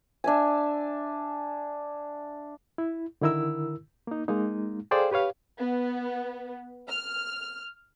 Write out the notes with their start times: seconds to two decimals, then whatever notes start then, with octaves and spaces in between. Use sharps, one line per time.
0.24 D4 E5 G#5
2.78 E4
3.21 D3 D#3 E4 A#4 E6
4.07 A#3 D#4
4.28 G#3 A#3 D#4
4.91 G#4 A4 C5 D5 F5 G5
5.11 G4 B4 C#5 F5
5.59 B3
6.89 F6